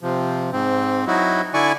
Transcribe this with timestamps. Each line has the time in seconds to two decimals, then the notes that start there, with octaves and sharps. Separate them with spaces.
0.01 C3 F3
0.52 G#2 C4
1.07 F#3 D#4 E4 F#4
1.54 D3 E4 D5 G#5 C#6